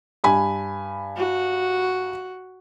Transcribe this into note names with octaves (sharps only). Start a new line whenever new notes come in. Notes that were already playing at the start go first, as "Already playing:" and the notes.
G2 G#5 B5
F#4